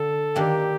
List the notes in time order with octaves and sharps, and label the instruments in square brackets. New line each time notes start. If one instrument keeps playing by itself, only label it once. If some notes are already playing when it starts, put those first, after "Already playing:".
Already playing: [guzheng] D3 [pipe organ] A4
[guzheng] D#3 A#3 D4 [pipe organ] G4